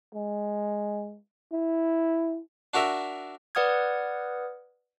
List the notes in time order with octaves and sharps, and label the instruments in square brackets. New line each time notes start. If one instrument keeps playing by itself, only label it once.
[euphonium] G#3
E4
[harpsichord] D4 F#4 A#4 E5
[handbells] B4 D5 F#5 D#6 F6 G#6